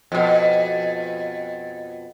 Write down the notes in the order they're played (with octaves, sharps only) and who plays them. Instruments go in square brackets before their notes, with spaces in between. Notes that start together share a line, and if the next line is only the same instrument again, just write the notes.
[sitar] F2 B2